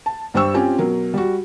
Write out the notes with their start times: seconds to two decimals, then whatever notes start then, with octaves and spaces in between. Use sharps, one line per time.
0.06 A5
0.34 G2 G3 C5 G5 C#6 E6
0.54 C4 C#4 F4 G4 G#5
0.78 B2 F#3 A#4
1.14 G3 F#4